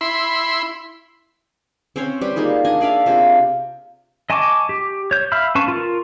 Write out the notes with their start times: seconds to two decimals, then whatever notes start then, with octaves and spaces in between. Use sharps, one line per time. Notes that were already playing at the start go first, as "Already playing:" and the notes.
0.01 E4 B5 C6
1.96 C4 C#4 C5 C#5
2.21 G3 G4 B4 C5
2.36 A#3 D#4 F4 G#4
2.65 D4 D#5 G#5
2.81 G#4 D5 E5 F5
3.06 C3 F4 G#4
4.30 D#5 G#5 A5 C#6 D6
4.69 G4
5.11 C#5 G6
5.32 E5 F5 B5 E6 F6
5.55 C#4 B4 F5 A5 C#6
5.68 F4 A#4